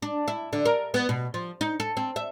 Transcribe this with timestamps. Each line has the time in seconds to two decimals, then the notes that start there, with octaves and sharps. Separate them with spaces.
0.02 D4
0.28 E4
0.53 D3
0.65 A#4
0.94 B3
1.09 B2
1.34 F3
1.61 D#4
1.80 A4
1.97 C4
2.16 E5